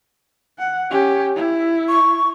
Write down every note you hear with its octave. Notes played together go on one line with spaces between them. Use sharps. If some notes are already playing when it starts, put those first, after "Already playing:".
F#5
C#4 G4
E4
C#6